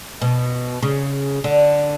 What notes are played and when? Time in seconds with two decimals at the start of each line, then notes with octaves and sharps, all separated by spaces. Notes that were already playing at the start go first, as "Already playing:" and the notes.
0.22 B2
0.82 C#3
1.44 D3